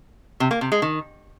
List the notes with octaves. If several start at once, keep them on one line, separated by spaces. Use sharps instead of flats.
C3
A#3
C3
G#3
D#3